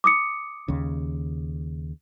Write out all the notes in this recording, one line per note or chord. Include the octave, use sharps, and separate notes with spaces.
D6 D#6 C#7
D#2 C#3